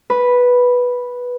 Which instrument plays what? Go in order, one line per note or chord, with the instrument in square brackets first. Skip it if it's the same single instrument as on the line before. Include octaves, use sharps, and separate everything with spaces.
[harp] B4